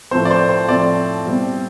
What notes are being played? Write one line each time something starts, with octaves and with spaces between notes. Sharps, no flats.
A2 F3 C4 C5
D5
C5
C5
A2 F3 C4 D5
B2 G3 C4